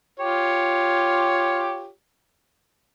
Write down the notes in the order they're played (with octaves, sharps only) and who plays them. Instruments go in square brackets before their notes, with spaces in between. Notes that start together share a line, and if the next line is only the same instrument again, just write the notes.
[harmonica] F4 G4 C#5